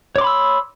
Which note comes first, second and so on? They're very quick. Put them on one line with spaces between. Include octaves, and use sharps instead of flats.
C#5 D6 C6 B5 E6